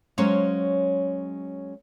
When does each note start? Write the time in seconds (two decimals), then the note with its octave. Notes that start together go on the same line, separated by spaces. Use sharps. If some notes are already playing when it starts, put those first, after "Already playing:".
0.18 F#3 G#3 C#4 C5 C#5 F5